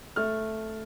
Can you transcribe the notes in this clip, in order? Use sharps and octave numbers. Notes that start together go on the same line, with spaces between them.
A3 F6